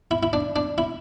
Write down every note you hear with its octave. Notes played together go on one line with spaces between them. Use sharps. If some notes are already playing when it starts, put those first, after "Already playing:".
E4
E4
D4
D4
E4